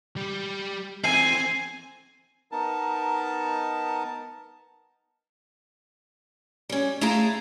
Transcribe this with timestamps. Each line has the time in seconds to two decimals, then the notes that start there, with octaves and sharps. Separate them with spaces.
0.16 G3 G4
1.04 C4 G#5 C7
2.52 B3 D#4 A#4 A5
6.69 G3 C#4
7.01 A3 E4 G#4 E5 F5 A#5